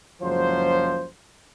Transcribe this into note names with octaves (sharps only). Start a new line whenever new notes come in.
F#1 C#2 F3 F#3 C5